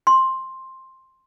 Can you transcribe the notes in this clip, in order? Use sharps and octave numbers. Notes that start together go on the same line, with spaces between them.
C6